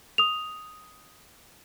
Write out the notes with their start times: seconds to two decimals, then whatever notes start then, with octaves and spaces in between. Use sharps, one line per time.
0.18 D#6 F7